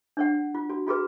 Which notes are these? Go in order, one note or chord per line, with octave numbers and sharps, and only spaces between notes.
D4 C#5 F#5
F4
F#4
F4 F#4 G#4 B4